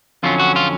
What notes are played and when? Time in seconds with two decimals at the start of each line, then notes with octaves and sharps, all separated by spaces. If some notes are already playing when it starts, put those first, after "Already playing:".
0.23 F2 D3 F#3 C#4 F4
0.40 F#4
0.56 F4